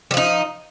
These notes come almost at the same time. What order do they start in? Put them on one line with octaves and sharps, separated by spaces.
G3 F3 D#4